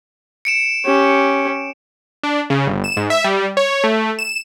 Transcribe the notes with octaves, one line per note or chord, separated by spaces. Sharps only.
C#7 D7 E7
C#4 G4
D4
C#3
G1
E7
G#2
E5
G3
C#5
A3
E7